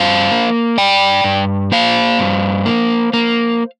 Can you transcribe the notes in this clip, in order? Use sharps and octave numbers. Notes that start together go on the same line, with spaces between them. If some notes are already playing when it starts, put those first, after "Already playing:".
Already playing: G2 C5 F5
A#3
G2 D5 G5
G2
A#3 C5 F5
G2
A#3
A#3